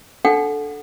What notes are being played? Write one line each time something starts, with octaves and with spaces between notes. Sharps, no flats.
D4 A4 F#5 G5